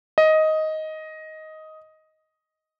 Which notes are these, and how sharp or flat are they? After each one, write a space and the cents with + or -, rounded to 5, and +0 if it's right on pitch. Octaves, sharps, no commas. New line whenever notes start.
D#5 +10